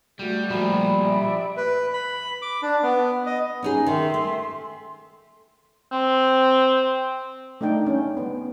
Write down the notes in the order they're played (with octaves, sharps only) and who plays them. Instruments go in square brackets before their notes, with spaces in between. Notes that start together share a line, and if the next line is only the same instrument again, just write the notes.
[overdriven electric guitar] G3 [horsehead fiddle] A3 F#4
[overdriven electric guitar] A#2 F3 [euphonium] G3 [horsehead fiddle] A3 [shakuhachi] B5
[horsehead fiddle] D5 E5
[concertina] B4
B5
D6
D4
B3
D#5
[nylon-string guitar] C#4 D#4 G#4
[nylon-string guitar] D#3 [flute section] E5 C6
[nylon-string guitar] A3
[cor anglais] C4
[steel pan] A3 D4 D#4 G5
C#4
B3